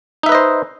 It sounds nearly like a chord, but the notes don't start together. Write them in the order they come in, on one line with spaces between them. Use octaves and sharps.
D#4 E5 B4 D#5 C5